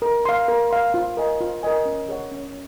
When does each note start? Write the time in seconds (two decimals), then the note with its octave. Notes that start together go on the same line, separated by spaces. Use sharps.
0.02 A#4
0.25 F5 C6
0.48 A#4
0.71 F5 C6
0.94 F4
1.17 A#4 D#5 G#5
1.40 F4
1.63 A#4 D#5 G#5
1.86 C#4
2.09 G#4 C#5 F#5
2.32 C#4